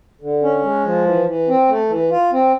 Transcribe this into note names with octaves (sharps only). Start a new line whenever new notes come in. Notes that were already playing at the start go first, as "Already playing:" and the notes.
D3
C#4
G#3
F3
E3
E3
C4
A3
E3
F4
C4